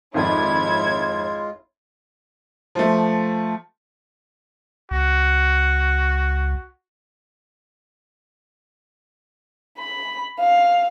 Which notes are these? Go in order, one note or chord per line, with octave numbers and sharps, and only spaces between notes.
G#1 F2 G#3 E4 F4 C#5 D5 G#6
F3 A3
C#2 F#4
B5
F5